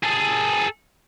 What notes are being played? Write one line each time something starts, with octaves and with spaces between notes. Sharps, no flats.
G#4 A4